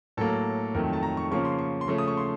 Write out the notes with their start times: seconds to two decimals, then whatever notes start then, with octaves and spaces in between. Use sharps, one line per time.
0.17 A2 F#3 A#3 A4
0.75 F2 D#3 F#3 A3 A#4
0.93 A5
1.03 A#5
1.17 C#6
1.31 C#3 F3 A#3 C#4 C#6
1.45 C6
1.59 C#6
1.81 C6
1.88 C#3 F3 A3 C#4 C#6
1.98 D#6
2.08 C#6
2.17 C6